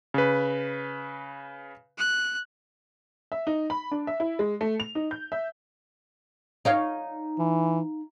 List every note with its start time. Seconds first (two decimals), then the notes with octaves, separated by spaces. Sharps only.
0.14 C#3 B4
1.98 F#6
3.32 E5
3.47 D#4
3.70 B5
3.92 D4
4.07 E5
4.20 E4
4.39 G#3
4.61 A3
4.80 F7
4.95 D#4
5.11 G6
5.32 E5
6.65 D#4 C#5 F5
7.39 E3